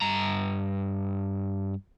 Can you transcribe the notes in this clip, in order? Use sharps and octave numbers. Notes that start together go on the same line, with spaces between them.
G2 A#5